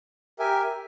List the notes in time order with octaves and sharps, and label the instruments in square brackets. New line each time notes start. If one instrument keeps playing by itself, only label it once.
[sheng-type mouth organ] G4 A#4 E5 G#5